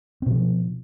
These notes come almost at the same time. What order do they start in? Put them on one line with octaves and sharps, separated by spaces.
C4 B2 F3